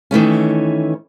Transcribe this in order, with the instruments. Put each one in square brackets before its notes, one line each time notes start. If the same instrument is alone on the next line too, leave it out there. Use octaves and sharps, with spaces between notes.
[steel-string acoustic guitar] D#3 E3 A3 C#4